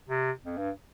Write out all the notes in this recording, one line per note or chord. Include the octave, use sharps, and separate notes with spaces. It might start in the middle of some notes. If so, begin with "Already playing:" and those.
C3
F2
G2